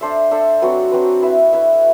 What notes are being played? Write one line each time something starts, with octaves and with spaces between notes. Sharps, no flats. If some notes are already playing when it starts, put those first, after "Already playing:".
D4 A4 C5 E5
D4 A4 C5 E5
F#3 C4 F#4 B4
F#3 C4 F#4 B4
E4 B4 E5
E4 B4 E5